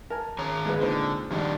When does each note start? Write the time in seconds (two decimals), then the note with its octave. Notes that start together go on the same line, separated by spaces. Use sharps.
0.10 A#4 G#5 A5
0.39 D#3 C#4 G#4 A#5
0.65 G1 G#3 B4
0.81 A#2 D3 C4 D#4
1.31 G2 D#3 F3 D4 D#4